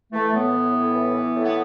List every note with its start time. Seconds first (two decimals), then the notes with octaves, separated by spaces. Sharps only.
0.13 E3 A3
0.33 A2 B3
0.53 E3
0.73 A2
0.93 E3
1.13 E3
1.33 A2
1.43 B3